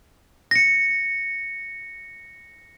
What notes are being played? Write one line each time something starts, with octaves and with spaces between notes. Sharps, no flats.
A#6 C#7